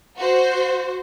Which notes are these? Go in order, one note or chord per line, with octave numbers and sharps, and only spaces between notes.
F#4 C5